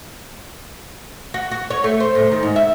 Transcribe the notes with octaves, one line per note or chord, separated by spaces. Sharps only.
F#4
F#4
C#5
A3
C5
A2
D#3
G#2
E5